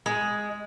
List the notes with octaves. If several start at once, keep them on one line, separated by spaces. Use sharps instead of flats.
G#3